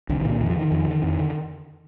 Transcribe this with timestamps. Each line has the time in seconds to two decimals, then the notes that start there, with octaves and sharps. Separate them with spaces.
0.09 C2 D3
0.20 D#3
0.25 A#2 D3
0.41 F2 D#3
0.50 F3
0.56 D3 D#3
0.71 F2
0.87 D3
1.03 F2
1.19 D3